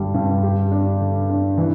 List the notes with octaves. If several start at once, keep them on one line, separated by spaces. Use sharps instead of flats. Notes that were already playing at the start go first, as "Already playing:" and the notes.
Already playing: G2 D3 G3
G2
G4
D4
D3
D4
E3